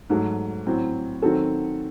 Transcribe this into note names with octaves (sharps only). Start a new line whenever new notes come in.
G#2 F#3 A3
A2 F#3 C4
D#3 F#3 C4 F#4 A4